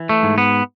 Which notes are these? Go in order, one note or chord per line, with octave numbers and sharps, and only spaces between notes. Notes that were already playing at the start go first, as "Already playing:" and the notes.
Already playing: E3
A3
G#2
B3